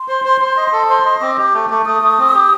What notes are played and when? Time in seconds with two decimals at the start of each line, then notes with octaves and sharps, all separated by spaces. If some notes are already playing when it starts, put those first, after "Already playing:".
Already playing: C6
0.08 C5
0.25 C5
0.41 C5
0.57 D#5
0.73 A4
0.89 C5
1.05 D#5
1.21 C4 D6
1.38 G4
1.54 A3
1.70 A3
1.86 A3 D#6
2.02 A3
2.18 C4
2.34 G4